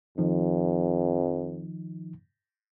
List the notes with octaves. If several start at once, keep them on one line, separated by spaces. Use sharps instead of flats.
F2 D#3 F3 D#4